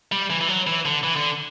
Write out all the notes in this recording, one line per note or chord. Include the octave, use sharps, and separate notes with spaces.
G3
E3
E3
F#3
E3
D3
E3
D3